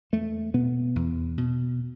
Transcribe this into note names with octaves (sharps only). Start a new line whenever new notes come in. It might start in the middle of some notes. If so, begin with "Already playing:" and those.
E2 A3
B2 B3
E2
B2